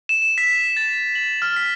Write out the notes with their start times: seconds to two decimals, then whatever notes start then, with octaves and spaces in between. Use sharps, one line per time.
0.09 E7
0.22 E7
0.38 B6
0.77 A6
1.15 F#7
1.42 F6
1.56 B6